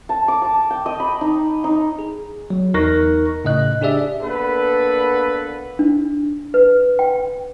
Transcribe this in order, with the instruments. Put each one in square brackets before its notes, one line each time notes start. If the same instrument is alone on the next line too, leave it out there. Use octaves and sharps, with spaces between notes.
[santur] A5
D6
A5
G5
D#5
B5
D#4
D#4
[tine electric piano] G#4
F#3
E2 D#4 A#4 C#6 F#6 A#6
A2 C#3 D#5 F#6
D4 G4 G#4 D5 E5
[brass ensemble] A#3 B3 D4 A4 B4
[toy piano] D4
B4
G5